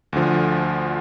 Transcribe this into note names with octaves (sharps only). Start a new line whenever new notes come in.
D2 D3 F3